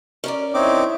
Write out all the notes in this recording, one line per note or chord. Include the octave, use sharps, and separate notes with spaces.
C#4 A#4 D5
C4 D#4 E4 C#5 E5 D6